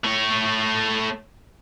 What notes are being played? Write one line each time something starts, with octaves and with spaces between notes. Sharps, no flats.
A3 C#5